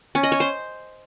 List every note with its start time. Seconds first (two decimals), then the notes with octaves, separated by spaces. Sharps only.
0.15 C#4
0.23 D#5
0.32 C#5
0.40 C5